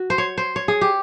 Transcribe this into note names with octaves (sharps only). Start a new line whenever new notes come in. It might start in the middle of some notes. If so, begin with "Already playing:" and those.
Already playing: F#4
C5
C#5
C5
C#5
G#4
G4